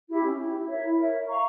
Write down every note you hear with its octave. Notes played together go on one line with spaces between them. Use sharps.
E4 G4
C#4
E4 G4
E4
A#4 C#5 E5
E4
A#4 C#5 E5
A#4
F5 A#5 C#6